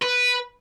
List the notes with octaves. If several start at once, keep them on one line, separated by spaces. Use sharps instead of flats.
B4